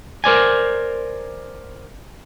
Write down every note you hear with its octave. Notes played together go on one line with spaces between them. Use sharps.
A#4 C5 D5 G#5